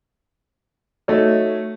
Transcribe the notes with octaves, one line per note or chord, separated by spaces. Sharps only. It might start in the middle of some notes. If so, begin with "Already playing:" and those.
A3 D#4 F#4 A4 C#5 D#5